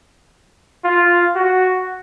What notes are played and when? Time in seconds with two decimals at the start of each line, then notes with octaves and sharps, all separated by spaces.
0.84 F4
1.35 F#4